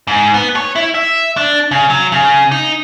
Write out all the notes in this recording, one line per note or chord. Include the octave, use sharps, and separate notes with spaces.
G#2
B3
C#5
E4
E5
D4
C#3
F#3
C#3
D#4